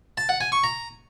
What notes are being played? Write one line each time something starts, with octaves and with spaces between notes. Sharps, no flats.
A5
F#5
G#5
C#6
A#5